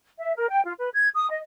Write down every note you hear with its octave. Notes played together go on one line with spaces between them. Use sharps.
E5
A#4
G5
F4
B4
G#6
D#6
D#5